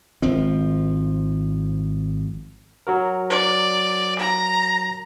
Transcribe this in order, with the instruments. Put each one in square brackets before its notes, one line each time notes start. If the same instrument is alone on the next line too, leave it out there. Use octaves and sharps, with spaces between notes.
[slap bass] G#1 F3 C4
[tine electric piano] F#3 F#4 A#4
[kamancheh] D5
A#5